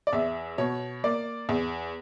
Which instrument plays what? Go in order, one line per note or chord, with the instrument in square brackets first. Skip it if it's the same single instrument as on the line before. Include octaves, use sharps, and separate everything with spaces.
[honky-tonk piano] D5
E2 E5
B2 C#5
A#3 D5
E2